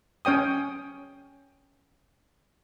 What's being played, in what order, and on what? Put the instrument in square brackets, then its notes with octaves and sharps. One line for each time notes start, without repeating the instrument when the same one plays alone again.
[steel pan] C#4 C#5 G5 D#6